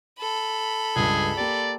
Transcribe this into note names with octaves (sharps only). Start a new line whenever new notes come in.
A4 B5
C#2 G2 G#4
A#3 G4 D5